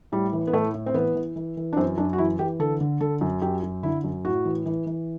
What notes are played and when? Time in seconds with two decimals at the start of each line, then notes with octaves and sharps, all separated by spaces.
0.12 A2 G3
0.33 E3
0.47 B3
0.53 A2 A3
0.74 A2
0.86 C4
0.94 E3 B3
1.15 E3
1.36 E3
1.57 E3
1.73 D4
1.77 F#2 C4
1.98 F#2 D4
2.13 F#4
2.18 E3 E4
2.39 E3 G4
2.59 D3 A4
2.81 D3
3.01 D3 A4
3.21 F#2
3.42 F#2 G4
3.63 F#2
3.83 D3 E4
4.04 F#2
4.25 A2 F#4
4.45 E3
4.66 E3
4.86 E3